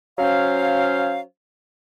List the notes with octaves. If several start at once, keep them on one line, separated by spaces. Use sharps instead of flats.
F#3 C#4 C5 F5